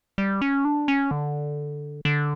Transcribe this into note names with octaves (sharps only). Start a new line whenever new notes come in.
G3
C#4
D4
C#4
D3
D3